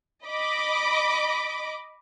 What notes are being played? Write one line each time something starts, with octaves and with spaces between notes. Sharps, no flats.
D#5 B5 D6